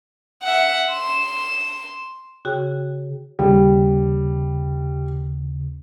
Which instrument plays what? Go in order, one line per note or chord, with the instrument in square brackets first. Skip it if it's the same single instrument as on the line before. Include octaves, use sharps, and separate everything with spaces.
[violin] E5 F#5
C6 E7
[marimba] C#3 F#4 G#4 G5
[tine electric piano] D#2 C#3 [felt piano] G3